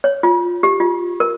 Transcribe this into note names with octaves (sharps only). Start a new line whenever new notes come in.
C#5
F4
G4
F4
A#4